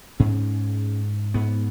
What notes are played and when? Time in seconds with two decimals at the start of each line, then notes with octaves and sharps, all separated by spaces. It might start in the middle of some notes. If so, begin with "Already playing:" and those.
0.20 G#2 C#4
1.34 G#2 B3